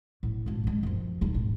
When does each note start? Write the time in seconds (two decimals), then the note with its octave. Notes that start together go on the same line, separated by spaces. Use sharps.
0.23 A2 B3
0.46 G#1 D4
0.64 G#1 G#3
0.83 F#2 F3
1.21 D#1 D#4
1.34 G#1